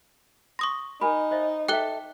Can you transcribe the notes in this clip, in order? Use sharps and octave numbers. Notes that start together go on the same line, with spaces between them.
C6 C#6 D#6 A#6
D#4 A#4 G#5 B5
C5 D#5 E5
A4 E5 G5 D6 F#6 G7